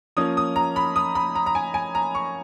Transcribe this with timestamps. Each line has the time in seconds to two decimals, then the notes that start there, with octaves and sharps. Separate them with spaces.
0.17 F3 A#3 C#4 D#6
0.37 D#6
0.56 A#5
0.76 B5
0.96 D#6
1.15 B5
1.35 A#5
1.46 A#5
1.55 G#5
1.74 G#5
1.95 A#5
2.15 C#6